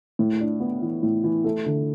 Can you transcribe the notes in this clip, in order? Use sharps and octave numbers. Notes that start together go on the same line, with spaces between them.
A2
D4
B3
E3
A2
E3
A3
D3